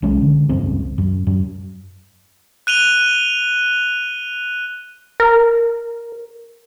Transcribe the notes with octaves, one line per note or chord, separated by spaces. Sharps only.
B1 F#3 G#3 C#4
D3
F1 C#2 G2 C4
F#2
F#2
F#6 D#7 F7 G7
A#4